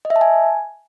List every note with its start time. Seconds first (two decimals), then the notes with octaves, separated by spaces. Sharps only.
0.05 D#5
0.10 E5
0.16 A5
0.21 G#5